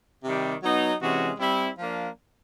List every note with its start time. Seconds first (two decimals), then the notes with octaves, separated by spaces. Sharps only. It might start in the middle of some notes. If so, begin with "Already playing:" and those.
0.24 C3 D#3 G3
0.63 F#3 B3 D#4
1.01 C3 E3 G#3 C#4 F#4
1.40 G3 C4 E4
1.78 F3 A#3 D4